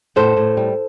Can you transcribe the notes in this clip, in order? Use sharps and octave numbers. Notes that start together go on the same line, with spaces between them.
A2 A4 C5
A2
G3